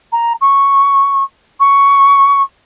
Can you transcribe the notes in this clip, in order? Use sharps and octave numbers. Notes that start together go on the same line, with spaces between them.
A#5
C#6
C#6